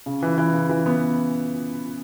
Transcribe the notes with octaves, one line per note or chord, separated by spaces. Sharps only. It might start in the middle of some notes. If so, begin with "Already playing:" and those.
C#3
E3
E3
C#3
E3
B3